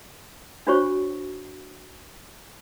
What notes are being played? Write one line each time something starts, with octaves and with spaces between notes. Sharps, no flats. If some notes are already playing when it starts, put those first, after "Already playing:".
D4 F4 F#4 C5 C#5 C#6